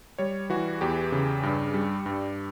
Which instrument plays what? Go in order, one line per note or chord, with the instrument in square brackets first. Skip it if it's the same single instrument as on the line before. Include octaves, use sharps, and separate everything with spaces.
[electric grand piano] G3 C#5
E3 F#4
E2 G4
C#3
G2
G3
G2